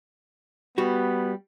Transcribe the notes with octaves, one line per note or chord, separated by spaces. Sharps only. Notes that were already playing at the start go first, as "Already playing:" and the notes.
G3 B3 F#4